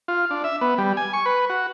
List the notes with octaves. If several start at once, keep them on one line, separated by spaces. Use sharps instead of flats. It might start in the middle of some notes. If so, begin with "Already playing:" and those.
F4
D4
E5
B3
G3
G#5
C#6
B4
F#4